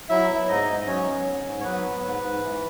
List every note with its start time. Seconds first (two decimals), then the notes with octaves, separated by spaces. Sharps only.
0.09 F#3 E4 E5
0.29 B3
0.48 G#2 D#4 D#5
0.67 G#2
0.81 D#5
0.87 F#3 C#4 C#5
1.06 B3
1.25 G#2
1.45 G#2
1.60 C#5
1.64 F#3 B3 B4
1.84 B3
2.03 G#2
2.22 G#2
2.42 E3